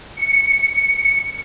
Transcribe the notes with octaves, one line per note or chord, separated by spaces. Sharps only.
C#7